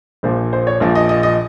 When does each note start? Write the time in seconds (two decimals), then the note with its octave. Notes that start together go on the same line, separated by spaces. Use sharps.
0.23 A#1 A#2 F3 C5
0.53 C5
0.67 C#5
0.80 A#1 A#2 F3
0.95 D#5
1.09 D#5
1.23 D#5